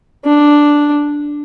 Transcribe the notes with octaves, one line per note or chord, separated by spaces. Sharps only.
D4